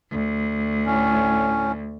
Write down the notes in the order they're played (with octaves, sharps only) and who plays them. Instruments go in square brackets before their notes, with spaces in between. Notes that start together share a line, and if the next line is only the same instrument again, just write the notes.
[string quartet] D2
[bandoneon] A2 C#4